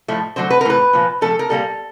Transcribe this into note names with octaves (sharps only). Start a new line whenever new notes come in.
A2 F3 A3
D3 F#3 A3 C5
B4
A#4
A2 E3 A3 B4
A#2 F3 A#3
A#2 F3 A3 A4
A#4
A#2 G3 A#3 A4